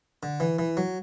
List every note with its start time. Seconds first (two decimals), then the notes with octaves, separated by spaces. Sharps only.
0.23 D3
0.40 E3
0.59 E3
0.77 F#3